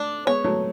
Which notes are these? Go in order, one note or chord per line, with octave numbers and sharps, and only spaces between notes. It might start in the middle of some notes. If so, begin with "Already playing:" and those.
Already playing: A3 D4
G#3 B3 C#5
F#3 A3